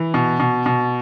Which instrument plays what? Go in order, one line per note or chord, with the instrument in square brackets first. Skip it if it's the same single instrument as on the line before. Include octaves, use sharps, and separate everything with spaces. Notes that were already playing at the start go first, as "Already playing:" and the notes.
Already playing: [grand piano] E3
B2
B2
B2